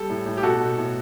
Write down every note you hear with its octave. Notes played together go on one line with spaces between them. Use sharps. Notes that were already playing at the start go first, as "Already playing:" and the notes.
Already playing: G3 A4
A2
A2
G4
B2 F#4 A4
B2
A2